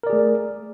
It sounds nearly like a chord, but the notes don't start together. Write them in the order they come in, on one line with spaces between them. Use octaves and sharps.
A#4 D5 G#4 A3